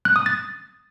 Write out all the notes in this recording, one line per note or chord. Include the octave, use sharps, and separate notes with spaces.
F#6
D#6
A6